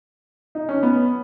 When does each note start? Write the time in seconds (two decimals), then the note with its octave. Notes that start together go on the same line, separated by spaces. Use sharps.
0.55 D#4
0.69 C#4
0.83 B3